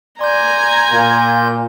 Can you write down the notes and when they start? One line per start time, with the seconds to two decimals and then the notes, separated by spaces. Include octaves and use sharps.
0.21 D5 G#5 A#5 C6 G6
0.92 A#2 F4